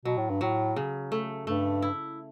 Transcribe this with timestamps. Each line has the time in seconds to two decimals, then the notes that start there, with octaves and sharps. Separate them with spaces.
0.05 B2 F#3
0.17 A2
0.30 G2
0.41 A2 F#3
0.76 C#3
1.12 A3
1.47 G2 A3
1.82 E4